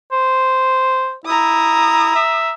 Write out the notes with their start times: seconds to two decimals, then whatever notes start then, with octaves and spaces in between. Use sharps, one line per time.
0.12 C5
1.26 E4 A#5 D#6
2.15 E5